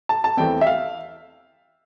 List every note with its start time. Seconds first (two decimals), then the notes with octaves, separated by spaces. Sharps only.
0.09 A5
0.24 A5
0.37 E2 E3 A3 C4 G5
0.61 E5
0.67 F5